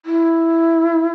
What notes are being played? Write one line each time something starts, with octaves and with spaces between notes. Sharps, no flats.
E4